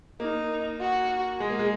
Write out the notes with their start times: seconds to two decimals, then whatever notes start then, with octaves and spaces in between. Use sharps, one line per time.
0.20 A#3 D#4
0.80 F#4
1.40 G#3 G#4
1.50 A#3
1.59 G#3